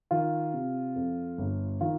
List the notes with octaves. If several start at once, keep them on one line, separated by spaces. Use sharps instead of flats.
D#3 F4
C3
F2
G1
D#3 F4